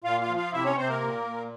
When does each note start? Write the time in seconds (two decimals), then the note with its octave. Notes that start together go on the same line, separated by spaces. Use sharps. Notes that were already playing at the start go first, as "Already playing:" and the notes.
0.04 A#2 F4 F5
0.21 F4 F5
0.29 F3
0.37 F4 F5
0.52 C3 E4 E5
0.64 C#4 C#5
0.77 C3 C4 C5
0.89 A#3 A#4
1.01 A#2
1.25 A#2